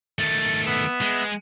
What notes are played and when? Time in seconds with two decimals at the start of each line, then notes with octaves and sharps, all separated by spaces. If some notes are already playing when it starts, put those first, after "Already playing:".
0.19 D#3 A3 A6
0.66 B3 E5
1.01 G#3